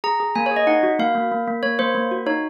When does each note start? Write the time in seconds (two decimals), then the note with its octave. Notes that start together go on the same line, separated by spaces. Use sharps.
0.04 G#4 A#5
0.20 G#4
0.36 A#3 G#5
0.46 C#5
0.51 G#4
0.56 D#5
0.67 D#4 F#5
0.83 F#4
0.99 A#3 F5
1.15 A#3
1.32 A#3
1.48 A#3
1.63 A#3 C#5
1.79 A#3 C5
1.95 A#3
2.11 F#4
2.26 D#4 C#5